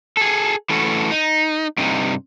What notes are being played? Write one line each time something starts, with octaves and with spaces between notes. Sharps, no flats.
G#4 A4
E3 A3 C#4 F#4 A4
D#4
G2 C3 D#4